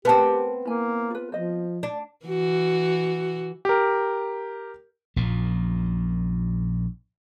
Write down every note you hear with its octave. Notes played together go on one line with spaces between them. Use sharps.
B3 C4 G4 A#4 B4 A5
A#3 E4 G#5
F4 B4
F3 C5 D#5
D4
E3 F#4
G4 A#4
A#1 F#2 A#2